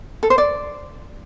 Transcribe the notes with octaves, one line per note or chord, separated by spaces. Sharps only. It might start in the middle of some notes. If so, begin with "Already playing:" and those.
A4
C5
D5